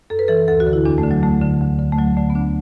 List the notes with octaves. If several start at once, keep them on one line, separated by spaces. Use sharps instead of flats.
F#2 A4
B4
E3 A4
D2 A4
F#4
D3
E4
E2 D4
A3
D3
F#3
D2 A3
D3
D2
D3
A3
D2 F#3
D3 A3
B3
D2 D4